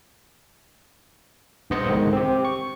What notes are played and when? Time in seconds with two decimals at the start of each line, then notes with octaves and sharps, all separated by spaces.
1.70 A#1 G2 B3 C5 D#5 C#7
1.89 C2 G#2 D3 D#3 G#3
2.13 C4 G4
2.45 C#6